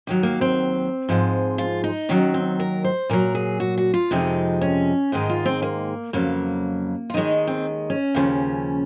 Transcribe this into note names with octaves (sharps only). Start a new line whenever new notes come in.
D#2 D#3 F#3
A#3
C4
G#2 F3 G#3
F4
D#4
D#2 D#3 F#3 C#4
C4
A#4
C5
A#2 F#3 A#4
G#4
F#4
F#4
F4
F2 C3 F3 G#3 D#4
C#4
G#2 D#3 G#3 D#4
F4
C4
A#3
F2 C#3 F#3 A#3
F4
D#2 D#3 G#3 D#4
C4
C#4
D#2 C#3 F3